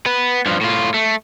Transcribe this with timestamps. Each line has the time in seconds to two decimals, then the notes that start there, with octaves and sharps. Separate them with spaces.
0.06 B3 B4
0.46 G2 F3
0.61 A2 F4
0.94 A3